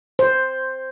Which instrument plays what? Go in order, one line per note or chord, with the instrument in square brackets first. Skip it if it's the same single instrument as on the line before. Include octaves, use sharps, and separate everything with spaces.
[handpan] C5